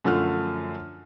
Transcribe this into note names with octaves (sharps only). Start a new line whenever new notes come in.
F#2 D3 F3 A3 F4 F6